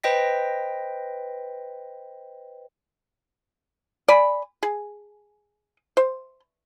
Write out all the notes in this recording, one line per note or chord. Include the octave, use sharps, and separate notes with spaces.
B4 C5 D#5 G5 A#6 B6
D5 G#5 B5
G#4
C5